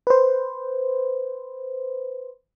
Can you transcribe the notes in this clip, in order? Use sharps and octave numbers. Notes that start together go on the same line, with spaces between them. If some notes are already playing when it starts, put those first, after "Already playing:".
B4 C5